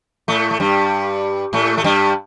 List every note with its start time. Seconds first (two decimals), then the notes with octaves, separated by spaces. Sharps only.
0.28 A2 A3
0.51 A3
0.60 G2 G3
1.53 A2 A3
1.77 A3
1.84 G2 G3